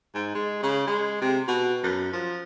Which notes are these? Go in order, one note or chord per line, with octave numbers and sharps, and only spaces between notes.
G#2
G#3
C#3
G#3
C3
B2
F#2
F3